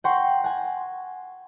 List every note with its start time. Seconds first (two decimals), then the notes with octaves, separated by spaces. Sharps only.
0.04 F#5 G5 A#5 C6 C#6
0.44 F#5 G#5